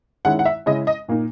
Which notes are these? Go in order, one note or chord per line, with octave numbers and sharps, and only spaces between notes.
D#3 G#3 C#4 E4 F#5
F#5
E5
C#3 G#3 C#4 E4 D#5
D#5
A#2 A#3 D#4